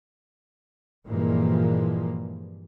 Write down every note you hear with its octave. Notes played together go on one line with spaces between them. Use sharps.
G2 A#2 E3 F3 G#3 A#3